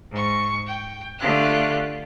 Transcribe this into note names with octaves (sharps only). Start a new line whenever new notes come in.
G#2 C#6
G5
D3 A3 F4 G4 F#6